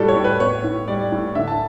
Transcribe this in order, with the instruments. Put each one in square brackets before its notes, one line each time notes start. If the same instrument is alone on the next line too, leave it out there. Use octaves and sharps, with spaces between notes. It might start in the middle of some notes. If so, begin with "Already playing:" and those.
Already playing: [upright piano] A2 G3 F#4 G4 A4
C#5
A2
B4
B3 C#5
A2
G3 D5
A2
D3 E5
A5